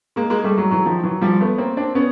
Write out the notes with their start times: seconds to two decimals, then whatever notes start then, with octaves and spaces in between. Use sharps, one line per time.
0.16 G#3 A#3
0.30 G#3 A#3
0.44 G3 A3
0.58 F#3 G#3
0.71 E3 F#3
0.86 D#3 F3
1.04 E3 F#3
1.21 F3 G3
1.41 A3 B3
1.58 A#3 C4
1.77 C4 D4
1.95 B3 C#4